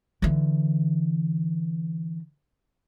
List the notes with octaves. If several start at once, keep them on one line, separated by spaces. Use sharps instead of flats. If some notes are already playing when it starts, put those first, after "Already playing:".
D3 E3